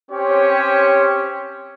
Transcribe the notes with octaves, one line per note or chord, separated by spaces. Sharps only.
C4 C#4 G4 C5 C#5